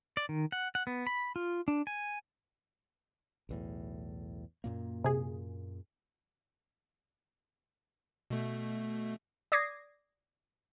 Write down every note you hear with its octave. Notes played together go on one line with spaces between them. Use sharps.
D5
D#3
F#5
F#5
B3
B5
F4
D4
G#5
B1 E2 A2
F#2 A#2 A#3
C3 G#4
B2 A3
D5 D6 D#6 G#6 A#6 C7